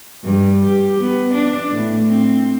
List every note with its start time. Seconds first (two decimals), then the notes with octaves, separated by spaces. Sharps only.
0.24 G2
0.65 G4
1.00 B3
1.34 D4
1.71 A2
2.09 C4